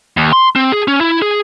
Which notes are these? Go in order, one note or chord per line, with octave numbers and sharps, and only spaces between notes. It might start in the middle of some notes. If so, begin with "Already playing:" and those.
D#2
C6
C4
G#4
C#4
E4
G#4